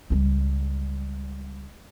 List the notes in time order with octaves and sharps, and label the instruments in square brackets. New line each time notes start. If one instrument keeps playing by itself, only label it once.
[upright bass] C#2 G3